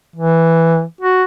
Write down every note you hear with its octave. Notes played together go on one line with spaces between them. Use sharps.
E3
F#4